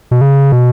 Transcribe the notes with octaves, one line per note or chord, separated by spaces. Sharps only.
B2
C#3
B2